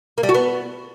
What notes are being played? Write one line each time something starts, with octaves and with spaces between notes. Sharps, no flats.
A#3
G3
F#4
B3